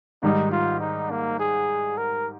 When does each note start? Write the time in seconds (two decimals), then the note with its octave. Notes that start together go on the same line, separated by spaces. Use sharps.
0.23 G#2 D#3 G3 D#4
0.51 F4
0.81 D#4
1.10 A#3
1.39 G#4
1.98 A#4